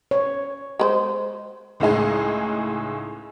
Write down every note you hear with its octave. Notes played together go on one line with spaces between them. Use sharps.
C#5
G#3 B4 C5
C#2 A2 G#3 D#4 G#4